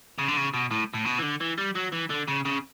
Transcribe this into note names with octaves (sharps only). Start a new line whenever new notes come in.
C#3
D3
C#3
B2
A2
A2
B2
E3
D3
E3
G3
F#3
E3
D3
C#3
C#3